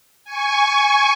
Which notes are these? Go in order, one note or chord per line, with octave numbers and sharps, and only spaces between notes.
G#5 C#6